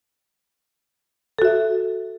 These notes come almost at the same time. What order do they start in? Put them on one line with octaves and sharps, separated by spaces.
A4 F#4 E5